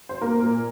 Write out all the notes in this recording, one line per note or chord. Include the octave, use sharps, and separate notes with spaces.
C5
A#3 A#4
A#2